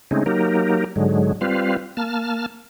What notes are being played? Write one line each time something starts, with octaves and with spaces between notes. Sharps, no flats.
C#3 G#3 A3 C4 C#4 D#4
F#3 A#3 D#4 G4 A#4
G#2 D3 F#3 G#3
G3 C4 F4 B4 F5
A#3 A5 F6